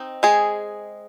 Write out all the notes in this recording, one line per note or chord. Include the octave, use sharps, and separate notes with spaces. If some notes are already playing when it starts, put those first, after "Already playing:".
Already playing: C4 D#4
G#3 G#4